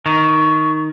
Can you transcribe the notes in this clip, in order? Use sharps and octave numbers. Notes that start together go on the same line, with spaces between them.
D#3 C#6